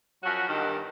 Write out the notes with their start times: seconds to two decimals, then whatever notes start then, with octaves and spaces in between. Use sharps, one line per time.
0.23 F#2 F3 F#3 F#4
0.48 E2 G2 D#3